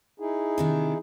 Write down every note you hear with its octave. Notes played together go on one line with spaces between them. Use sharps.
D#4 E4 G#4
C3 D#3 D4